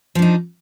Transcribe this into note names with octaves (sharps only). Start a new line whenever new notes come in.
F3 D4 D#4